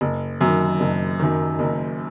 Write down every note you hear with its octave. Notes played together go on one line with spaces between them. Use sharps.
F#1
F#2 D#3
F#1
F#2 D#3
F#1